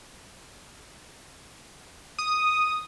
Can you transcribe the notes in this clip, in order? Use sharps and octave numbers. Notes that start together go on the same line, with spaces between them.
D#6